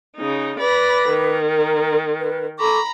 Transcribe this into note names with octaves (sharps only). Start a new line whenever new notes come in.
C#3 D#4
B4 D5 B5 D6 A#6
D#3
A#4
B4
A4 A#5 B5 C#6 D6